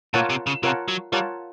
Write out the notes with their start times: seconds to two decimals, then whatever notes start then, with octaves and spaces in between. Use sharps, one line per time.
0.14 A#2 F4 A#4 C#5 F#5 A5
0.30 C3
0.47 C#3
0.63 C3 F4 A#4 C#5 F#5 A5
0.88 F#3
1.12 G3 F4 A#4 C#5 F#5 A5